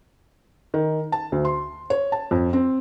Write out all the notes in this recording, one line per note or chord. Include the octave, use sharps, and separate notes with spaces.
D#3
A5
D2
C6
C#5
A5
F2
C4